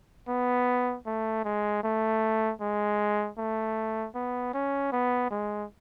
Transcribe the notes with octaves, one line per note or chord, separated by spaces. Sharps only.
B3
A3
G#3
A3
G#3
A3
B3
C#4
B3
G#3